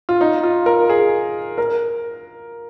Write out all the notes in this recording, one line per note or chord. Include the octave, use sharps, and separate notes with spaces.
F4
D#4
F4
A#4
G#4
A#4